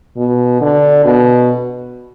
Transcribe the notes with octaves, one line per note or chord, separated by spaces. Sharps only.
B2
D3
B2